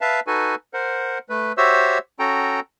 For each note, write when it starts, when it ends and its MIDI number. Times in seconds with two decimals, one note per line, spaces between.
0.01 0.20 71
0.01 0.20 76
0.01 0.20 77
0.01 0.20 81
0.27 0.55 63
0.27 0.55 66
0.27 0.55 69
0.27 0.55 71
0.27 0.55 80
0.74 1.18 70
0.74 1.18 72
0.74 1.18 78
1.29 1.52 57
1.29 1.52 71
1.57 1.98 66
1.57 1.98 67
1.57 1.98 72
1.57 1.98 73
1.57 1.98 76
1.57 1.98 88
2.19 2.60 61
2.19 2.60 66
2.19 2.60 69
2.19 2.60 79
2.19 2.60 82